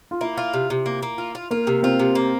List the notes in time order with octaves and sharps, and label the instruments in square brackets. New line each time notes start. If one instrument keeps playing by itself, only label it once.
[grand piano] F4
[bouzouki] A#3 [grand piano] E4
[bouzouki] F4
C3
C3
A#3
A#3
F4
F4
[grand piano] A#3 [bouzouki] F4
[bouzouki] C3
[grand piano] C4 [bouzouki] F4
[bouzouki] C3
A#3